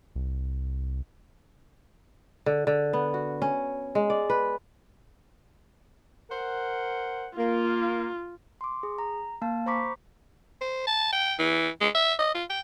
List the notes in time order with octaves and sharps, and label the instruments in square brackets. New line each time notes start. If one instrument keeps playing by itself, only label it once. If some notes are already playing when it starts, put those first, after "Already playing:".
[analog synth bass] C2
[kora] D3
D3
B3
F#4
C#4
G#3
D5
B4
[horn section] A#4 C5 F#5
[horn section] A#3 [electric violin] F4
[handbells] C6 D6
G#4
A#5
A#3 F5 A5
C5 A#5 B5 C#6 D6 B6
[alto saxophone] C5
A5
G5
E3
G#3
E5
D#5
F4
G5